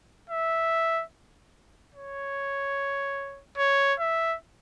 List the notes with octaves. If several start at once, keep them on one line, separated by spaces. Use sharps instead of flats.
E5
C#5
C#5
E5